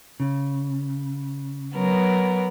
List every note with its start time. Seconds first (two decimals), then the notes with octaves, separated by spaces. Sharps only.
0.20 C#3
1.75 F#3 B3 A#4